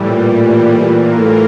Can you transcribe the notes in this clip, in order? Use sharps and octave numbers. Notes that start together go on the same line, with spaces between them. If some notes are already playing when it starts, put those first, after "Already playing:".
Already playing: A2 E3 G3
A#2
A#2 E3 A#3 F4 A#4
A2